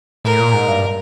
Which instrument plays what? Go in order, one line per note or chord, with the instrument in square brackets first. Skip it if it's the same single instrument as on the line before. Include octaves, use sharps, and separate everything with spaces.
[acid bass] A2 [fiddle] A#4
[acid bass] A#2
G#2
G2